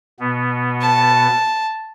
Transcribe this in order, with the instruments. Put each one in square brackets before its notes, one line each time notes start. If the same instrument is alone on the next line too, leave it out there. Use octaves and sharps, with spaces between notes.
[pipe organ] B2 B3
[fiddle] A5